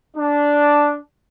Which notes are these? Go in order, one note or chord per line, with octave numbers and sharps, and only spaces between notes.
D4